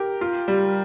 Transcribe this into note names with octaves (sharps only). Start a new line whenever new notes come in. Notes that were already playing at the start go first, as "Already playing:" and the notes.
Already playing: G4 A#4
F4
G3